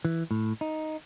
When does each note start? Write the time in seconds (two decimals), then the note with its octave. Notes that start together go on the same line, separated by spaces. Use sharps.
0.05 E3
0.31 A2
0.61 D#4